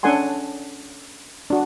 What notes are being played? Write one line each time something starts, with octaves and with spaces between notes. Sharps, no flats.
C#4 D4 A4 F#5 G#5 C6
D4 F#4